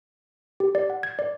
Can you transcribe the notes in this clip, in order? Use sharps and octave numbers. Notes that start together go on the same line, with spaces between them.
G4
D5
F#5
G#6
D5